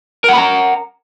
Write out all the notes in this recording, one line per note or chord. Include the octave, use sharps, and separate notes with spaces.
A#4 F#5 A#5 B5